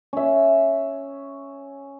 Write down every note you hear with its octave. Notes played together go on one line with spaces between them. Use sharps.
C#4 E5